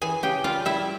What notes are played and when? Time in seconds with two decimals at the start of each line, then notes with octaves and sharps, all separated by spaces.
0.02 E3 G#4 G#5
0.23 C#3 G4 G5
0.44 G3 F4 F5
0.65 G3 E4 E5